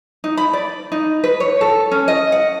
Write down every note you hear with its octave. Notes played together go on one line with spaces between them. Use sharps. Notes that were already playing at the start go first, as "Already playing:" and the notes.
D#4
B5
D5
D#4
B4
C#5
A4
C#4
D#5
F#5